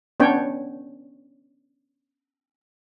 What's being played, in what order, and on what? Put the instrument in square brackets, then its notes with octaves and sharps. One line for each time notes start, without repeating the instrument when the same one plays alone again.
[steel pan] B3 C#4 D4 C#5 G5